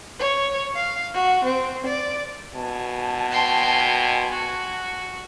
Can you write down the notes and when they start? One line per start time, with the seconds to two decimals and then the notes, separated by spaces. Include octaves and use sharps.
0.19 C#5
0.75 F5
1.14 F#4
1.45 C4
1.86 D5
2.55 B2 G#5 A5
3.32 G5 C6
4.31 F#4